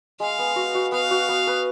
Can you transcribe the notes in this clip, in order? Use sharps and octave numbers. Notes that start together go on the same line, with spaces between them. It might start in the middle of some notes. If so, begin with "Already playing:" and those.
G#3 F5
B3
F#4
F#4
B3 F5
F#4
B3
B4